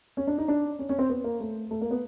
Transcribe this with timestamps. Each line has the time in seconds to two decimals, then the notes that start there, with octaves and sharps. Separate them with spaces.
0.17 C#4
0.27 D4
0.38 D#4
0.48 D4
0.79 C#4
0.89 C#4
0.99 C4
1.10 B3
1.24 A#3
1.40 A3
1.71 A3
1.81 A#3
1.91 B3